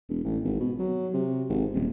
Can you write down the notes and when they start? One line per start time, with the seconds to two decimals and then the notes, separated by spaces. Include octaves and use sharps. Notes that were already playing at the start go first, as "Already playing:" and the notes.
0.09 E1
0.24 A1
0.45 G#1
0.60 B2
0.79 F#3
1.14 C3
1.49 G#1
1.74 D#1